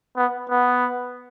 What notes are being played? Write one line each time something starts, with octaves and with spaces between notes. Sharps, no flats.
B3
B3